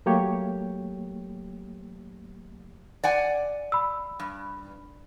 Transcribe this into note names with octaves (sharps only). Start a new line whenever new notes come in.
F#3 A3 A#3 G4 C#5
D5 F#5 G#5
B5 E6
G2